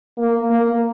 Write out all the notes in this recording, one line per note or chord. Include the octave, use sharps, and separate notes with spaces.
A#3
A#3